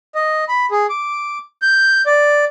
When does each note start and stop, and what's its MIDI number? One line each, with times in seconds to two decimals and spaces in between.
0.15 0.44 75
0.49 0.66 83
0.71 0.86 68
0.90 1.38 86
1.62 2.02 91
2.06 2.45 74